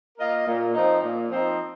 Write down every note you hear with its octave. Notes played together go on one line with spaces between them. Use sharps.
A#3 F4 A#4 D#5
A#2
F3 C4 D#4
A#2
F3 C4 D#4